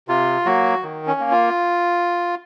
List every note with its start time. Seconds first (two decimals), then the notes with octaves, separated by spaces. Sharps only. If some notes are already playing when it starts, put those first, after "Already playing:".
0.08 C3 F4
0.45 F#3 A#3 F#4
0.83 D#3
1.07 C#4
1.20 A#3
1.31 F4